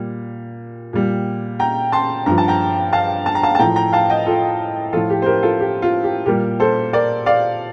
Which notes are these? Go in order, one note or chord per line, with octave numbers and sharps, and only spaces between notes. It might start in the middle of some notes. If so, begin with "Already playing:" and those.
Already playing: A#2 G3
A#2 G3
G5 A#5
A5 C6
G2 F3 A#5
A5
G5 A#5
F5 A5
A5
A#5
F5 A5
A5
A2 F3 G5 A#5
G5 A#5
F5 A5
D#5 G5
F4 A4
A2 F3 F4 A4
G4
C5
G4 A#4
F4 A4
G4
F4
G4
A#2 G3 G4 A#4
A4 C5
A#4 D5
D5 F5